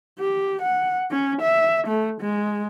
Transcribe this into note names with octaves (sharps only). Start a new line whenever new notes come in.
G4
F#5
C#4
E5
A3
G#3